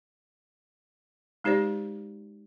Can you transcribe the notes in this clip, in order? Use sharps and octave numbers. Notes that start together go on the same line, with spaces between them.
G#3 D#4 G4 C5 D5